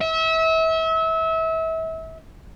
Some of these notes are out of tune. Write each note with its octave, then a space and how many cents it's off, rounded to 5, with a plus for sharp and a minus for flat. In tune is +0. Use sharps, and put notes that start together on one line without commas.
E5 -30